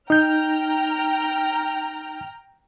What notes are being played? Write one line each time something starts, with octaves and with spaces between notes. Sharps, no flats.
D#4 G5 A#5 F6 G6